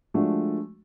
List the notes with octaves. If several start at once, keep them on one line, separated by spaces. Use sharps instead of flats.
F3 G#3 A3 D4 F#4